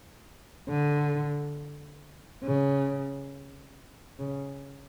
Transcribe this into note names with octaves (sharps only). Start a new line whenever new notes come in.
D3
C#3
C#3